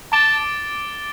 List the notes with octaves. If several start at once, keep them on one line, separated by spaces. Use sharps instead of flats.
A5 D6 A6 D7 G7